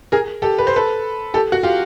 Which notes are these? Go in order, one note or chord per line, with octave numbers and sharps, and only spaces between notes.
G#4 A#4
G4 A4
B4
C5
A4 B4
G4 A4
F#4
F4 G4